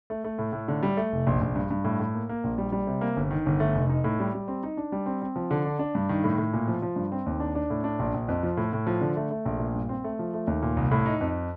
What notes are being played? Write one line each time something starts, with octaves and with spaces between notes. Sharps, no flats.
A3
A3
A2
A2
D3
G3
A3
F1
A#1
A#1
G2
G2
A2
A2
A#3
A#3
A#1
G3
G3
C3
A#3
G1
D#3
G1
A3
F1
D#4
A2
G3
G3
C4
D#4
D4
G3
C4
C4
F3
D3
D4
D4
G2
D#3
A2
A2
A#2
F3
F3
G2
C4
D#2
D4
D4
A2
D4
A#1
A#1
F2
F3
A2
A2
F3
D3
A3
A3
A#1
A#2
G2
C4
A3
F3
A3
D#2
A#2
C2
A2
D#4
F2